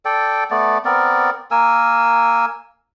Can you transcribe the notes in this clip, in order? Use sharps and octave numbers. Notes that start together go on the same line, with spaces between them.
A4 D5 G5
A3 B3 D5
B3 C4 A#4 D5
A#3 A#4 G#5 E6